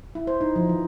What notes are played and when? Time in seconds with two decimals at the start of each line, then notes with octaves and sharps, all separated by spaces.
0.15 E4
0.27 C5
0.41 D#4
0.56 F3
0.69 E3